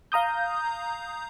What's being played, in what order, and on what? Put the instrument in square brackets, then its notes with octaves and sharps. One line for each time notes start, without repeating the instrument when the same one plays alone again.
[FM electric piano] F5 A#5 D#6 G6